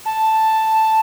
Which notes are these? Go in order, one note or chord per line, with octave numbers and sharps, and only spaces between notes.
A5